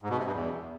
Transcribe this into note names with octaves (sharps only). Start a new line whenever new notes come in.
G#2
B2
C3
G2
E2